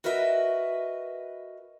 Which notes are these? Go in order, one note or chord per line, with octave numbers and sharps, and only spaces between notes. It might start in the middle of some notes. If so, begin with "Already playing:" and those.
F#4 A#4 B4 D#5 E5